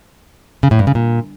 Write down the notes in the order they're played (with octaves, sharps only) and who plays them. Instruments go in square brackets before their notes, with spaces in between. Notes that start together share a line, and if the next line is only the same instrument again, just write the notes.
[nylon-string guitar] C#3
A2
G2
C#3
A#2